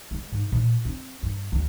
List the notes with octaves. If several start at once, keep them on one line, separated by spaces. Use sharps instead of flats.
G#3
G#2
A#2
C4
G2
D2